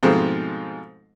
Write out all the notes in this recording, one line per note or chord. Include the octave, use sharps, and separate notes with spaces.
G#2 B2 F3 G#3 A3 C4